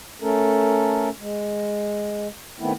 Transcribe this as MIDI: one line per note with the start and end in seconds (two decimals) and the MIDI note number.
0.22 1.09 57
0.22 1.09 61
0.22 1.09 69
0.22 1.09 70
1.20 2.28 56
2.60 2.72 51
2.60 2.72 57
2.60 2.72 59
2.60 2.72 60
2.60 2.72 64